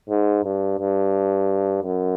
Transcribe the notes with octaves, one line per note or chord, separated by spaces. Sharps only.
G#2
G2
G2
F#2